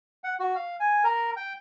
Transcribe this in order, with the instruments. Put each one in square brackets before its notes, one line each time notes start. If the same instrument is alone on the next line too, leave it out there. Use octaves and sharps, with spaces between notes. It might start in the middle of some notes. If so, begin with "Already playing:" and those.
[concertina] F#5
F#4
F5
G#5
A#4
G5